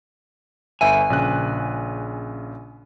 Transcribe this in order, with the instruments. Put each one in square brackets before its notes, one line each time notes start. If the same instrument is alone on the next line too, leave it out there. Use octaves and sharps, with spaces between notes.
[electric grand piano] G1 E5 D#7 [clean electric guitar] G#5
[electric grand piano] A#1 C#3 F#6